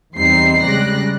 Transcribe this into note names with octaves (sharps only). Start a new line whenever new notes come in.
E2 G3 C4 D#4 C7
C#3 G3 G#3 D5 F#6 A#6